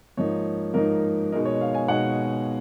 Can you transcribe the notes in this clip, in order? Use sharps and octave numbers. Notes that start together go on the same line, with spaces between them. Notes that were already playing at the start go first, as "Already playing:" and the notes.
G#2 F3 A#3 D#4 C#5
G#2 F3 A#3 D#4 A#4
B2 G#3 D#4 A#4
C#5
F5
G#5
B2 G#3 D#4 F#5